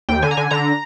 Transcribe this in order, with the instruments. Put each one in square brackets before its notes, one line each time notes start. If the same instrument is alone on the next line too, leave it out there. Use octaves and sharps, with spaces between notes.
[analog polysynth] D#2 G5
D3 G#5
A#5
D3 G#5
D3 A#5